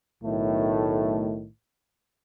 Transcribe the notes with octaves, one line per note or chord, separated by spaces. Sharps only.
B1 A2 D#3 A3